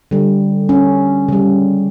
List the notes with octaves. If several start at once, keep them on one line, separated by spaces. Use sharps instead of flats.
D3 G3
C#4
C#3 G3